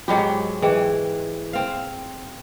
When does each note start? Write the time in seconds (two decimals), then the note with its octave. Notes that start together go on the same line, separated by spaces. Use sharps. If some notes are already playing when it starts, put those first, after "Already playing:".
0.08 G#2 F#3 F4 G4 D#5 G5
0.62 E3 G#4 D#5 G5
1.53 C4 F5